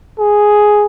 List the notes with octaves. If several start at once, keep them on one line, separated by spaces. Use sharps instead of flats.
G#4